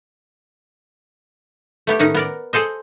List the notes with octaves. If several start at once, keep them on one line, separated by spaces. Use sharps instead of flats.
A3 B3 G4
A2 D#3 C#4 D#4 F#5
B3 A#4 D5
G#4 A4 C5 D#5